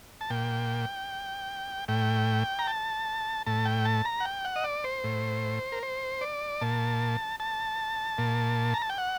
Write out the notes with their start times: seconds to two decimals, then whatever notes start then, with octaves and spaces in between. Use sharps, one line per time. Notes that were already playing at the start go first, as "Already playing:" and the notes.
0.21 A5
0.30 A#2 G5
1.88 A2 G5
2.59 A#5
2.67 A5
3.46 A2 A5
3.65 G5
3.85 A5
4.05 A#5
4.20 F#5
4.25 G5
4.45 F#5
4.56 D#5
4.64 D5
4.84 C5
5.04 A2
5.72 A#4
5.83 C5
6.21 D5
6.61 A#2 A5
7.40 A5
8.18 A#2
8.74 A#5
8.82 A5
8.90 G5
8.98 F#5